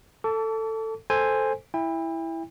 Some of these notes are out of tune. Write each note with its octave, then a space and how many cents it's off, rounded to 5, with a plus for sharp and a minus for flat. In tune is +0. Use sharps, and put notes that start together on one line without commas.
A4 +15 A5 +0 D6 -45
A4 +0 C5 +0 G#5 -10
E4 +0 G5 +40